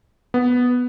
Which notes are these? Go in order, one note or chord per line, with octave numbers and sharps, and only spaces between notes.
B3